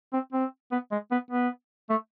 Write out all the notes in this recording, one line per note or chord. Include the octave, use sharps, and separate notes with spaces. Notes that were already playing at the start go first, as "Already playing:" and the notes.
C4
C4
B3
G#3
B3
B3
A3